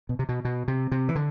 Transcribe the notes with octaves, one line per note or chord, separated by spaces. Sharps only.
B2
C3
B2
B2
C3
C3
E3
D3